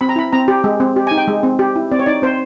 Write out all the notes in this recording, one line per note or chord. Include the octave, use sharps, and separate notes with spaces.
C4 B5
A#5
E4 B5
C4 A#5
G4
G#3
C4
G4
G#5
D#4
G5
G#3
C4
G4
E4
C4 D5
C#5
D#4 D5
C4 C5